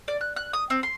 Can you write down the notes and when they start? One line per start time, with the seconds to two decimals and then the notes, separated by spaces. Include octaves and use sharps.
0.08 D5
0.21 F#6
0.36 F#6
0.53 D#6
0.70 C4
0.83 C6